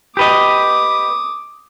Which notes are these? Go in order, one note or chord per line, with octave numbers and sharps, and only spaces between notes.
G4 B4 D#5 D6 D#6